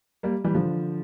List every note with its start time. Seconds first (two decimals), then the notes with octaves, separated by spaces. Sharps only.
0.23 G3 A#3
0.44 E3 G3
0.54 D3 F3